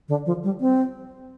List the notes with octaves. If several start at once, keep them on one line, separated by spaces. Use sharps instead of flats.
D3
F3
G3
C4